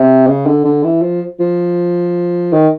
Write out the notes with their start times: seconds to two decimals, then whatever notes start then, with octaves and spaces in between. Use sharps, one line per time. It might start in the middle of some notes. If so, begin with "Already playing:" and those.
Already playing: C3
0.27 C#3
0.46 D3
0.65 D3
0.84 E3
1.02 F3
1.40 F3
2.53 D#3